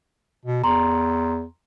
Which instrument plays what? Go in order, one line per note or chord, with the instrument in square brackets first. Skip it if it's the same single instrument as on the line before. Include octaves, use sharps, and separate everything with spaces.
[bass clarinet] B2
[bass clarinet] E2 [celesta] A#5 C6